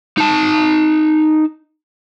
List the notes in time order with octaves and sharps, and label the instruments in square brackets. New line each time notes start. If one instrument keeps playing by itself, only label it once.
[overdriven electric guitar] D#4 A5